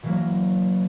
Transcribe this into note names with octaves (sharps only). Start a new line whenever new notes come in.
B2 E3 F#3 A#3